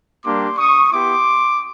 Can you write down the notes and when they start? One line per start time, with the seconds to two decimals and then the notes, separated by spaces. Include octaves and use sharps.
0.23 G3 A#3 D4 G4 C6 D6
0.57 C#6 D#6
0.91 B3 E4 G4 C6 D6